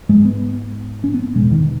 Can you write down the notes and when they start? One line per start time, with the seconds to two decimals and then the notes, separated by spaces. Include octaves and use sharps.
0.09 G#2 G#3
0.25 B3
1.04 C#4
1.14 B3
1.36 B2 G#3
1.40 E2
1.51 D#3